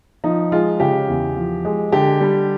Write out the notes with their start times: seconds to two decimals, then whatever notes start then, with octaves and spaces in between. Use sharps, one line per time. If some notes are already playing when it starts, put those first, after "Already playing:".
0.24 F3 D#4
0.52 G#3 F4
0.80 C#3 G4
1.08 E2
1.36 F3
1.65 G#3
1.92 D3 G4
2.21 G3